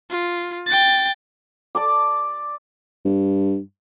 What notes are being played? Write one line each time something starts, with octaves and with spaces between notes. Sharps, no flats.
F4
G5 A6
D5 A5 D6
G2